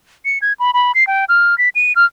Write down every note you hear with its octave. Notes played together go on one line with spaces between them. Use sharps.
C#7
G#6
B5
B5
C7
G5
F6
B6
D#7
F6